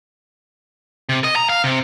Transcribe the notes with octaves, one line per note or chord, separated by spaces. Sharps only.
C3
D#5
A#5
F5
C3